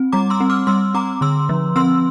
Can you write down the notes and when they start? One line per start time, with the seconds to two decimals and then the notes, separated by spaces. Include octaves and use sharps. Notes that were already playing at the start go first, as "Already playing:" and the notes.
Already playing: C4
0.12 G3 A#5 D6
0.30 C6 E6
0.40 C4
0.50 D6 F6
0.67 G3 C6 E6
0.94 C4 A#5 D6
1.21 D3 C6 E6
1.49 F3
1.76 C4 C6 E6